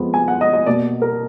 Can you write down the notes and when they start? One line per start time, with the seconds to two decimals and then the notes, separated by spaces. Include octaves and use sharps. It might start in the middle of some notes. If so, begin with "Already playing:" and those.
Already playing: F2 F3 G#3 B3
0.14 G#5
0.28 F#5
0.41 D#5
0.53 D#5
0.66 B2 A#3 D5
1.02 A#4